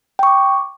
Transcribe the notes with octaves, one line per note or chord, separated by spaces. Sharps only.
G5 C#6 D6